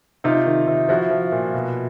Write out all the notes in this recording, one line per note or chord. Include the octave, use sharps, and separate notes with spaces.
C3 D#4 F4
D#3
C3
F3 E4 F#4
F3
A#2
B2